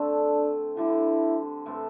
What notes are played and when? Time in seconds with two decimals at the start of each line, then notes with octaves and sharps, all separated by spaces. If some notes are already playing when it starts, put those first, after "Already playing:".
Already playing: D3 A3 C4 D4 A4
0.77 D3 G3 D4 E4
1.66 A2 E3 C4 A4